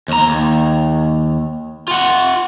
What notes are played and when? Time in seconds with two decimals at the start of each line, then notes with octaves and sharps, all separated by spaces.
0.08 D#2 A#5
0.27 D#2
1.88 F4 F#5